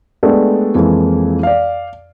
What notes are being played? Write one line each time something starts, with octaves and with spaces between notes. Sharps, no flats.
G#3 A3 B3 D4 G4
F2 E3 G#3 A#3
D5 F5